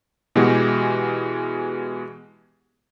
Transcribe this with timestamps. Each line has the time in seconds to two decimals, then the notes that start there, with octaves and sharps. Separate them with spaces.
0.36 B2 E3 G#3 F#4 G4